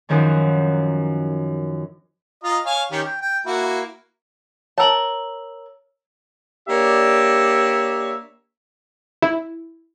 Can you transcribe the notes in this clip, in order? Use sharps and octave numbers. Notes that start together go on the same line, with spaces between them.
F#2 D#3 F3 F#3
F4 D#5 A#5
C#5 F5 G#5
D#3 C#4 G4
G5
G5
A#3 E4 F#4
A#4 C#5 A5 E6 F#7
A#3 D4 G4 C#5 D5 E5
E4